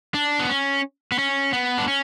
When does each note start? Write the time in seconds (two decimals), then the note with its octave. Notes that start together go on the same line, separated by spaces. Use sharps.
0.14 D4
0.39 B3
0.49 C#4
1.12 B3
1.19 C#4
1.53 B3
1.77 D4
1.88 C#4